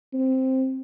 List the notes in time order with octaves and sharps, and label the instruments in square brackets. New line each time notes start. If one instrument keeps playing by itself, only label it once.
[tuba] C4